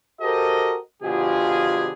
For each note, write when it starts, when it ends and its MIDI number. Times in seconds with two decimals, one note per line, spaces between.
0.21 0.76 66
0.21 0.76 67
0.21 0.76 69
0.21 0.76 70
0.21 0.76 72
0.21 0.76 75
1.03 1.92 47
1.03 1.92 50
1.03 1.92 53
1.03 1.92 65
1.03 1.92 67
1.03 1.92 68